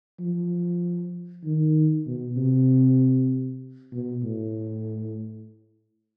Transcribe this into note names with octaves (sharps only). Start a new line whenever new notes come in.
F3
D#3
B2
C3
B2
A2